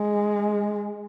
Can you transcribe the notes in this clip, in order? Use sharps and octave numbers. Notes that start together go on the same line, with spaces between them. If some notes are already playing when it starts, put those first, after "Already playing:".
Already playing: G#3